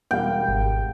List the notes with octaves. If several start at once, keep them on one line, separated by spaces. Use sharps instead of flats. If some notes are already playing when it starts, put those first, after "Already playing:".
E1 G3 F5 G5
G#1